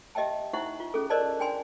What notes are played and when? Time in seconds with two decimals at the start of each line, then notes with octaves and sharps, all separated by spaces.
0.15 G4 D#5 E5 G5 A5
0.53 D#4 E4 C5 E5 F#5 C#6
0.80 F4
0.94 C#4 G#4 A4
1.10 A#4 C5 D5 D#5 A5
1.40 D4 G5 G#5 C6